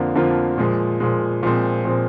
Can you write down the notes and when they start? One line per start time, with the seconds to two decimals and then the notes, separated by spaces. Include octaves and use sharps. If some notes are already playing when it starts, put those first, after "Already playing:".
Already playing: F2 D3 F3 A#3 F4
0.15 F2 D3 F3 A#3 F4
0.58 A#2 F3 G#3
1.00 A#2 F3 G#3
1.43 A#2 F3 G#3 C4
1.85 A#2 F3 G#3 C4